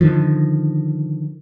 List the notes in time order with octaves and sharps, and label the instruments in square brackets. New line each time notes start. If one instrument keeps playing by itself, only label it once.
[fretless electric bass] D3 D#3 F3